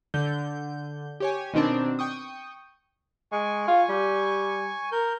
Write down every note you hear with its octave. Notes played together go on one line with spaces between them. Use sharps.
D3 G6
G4 C#5 G#5
B2 D#3 C4 D4
G5 C#6 D#6
G#3 G#5 C#6
F4
G3
A#4 G6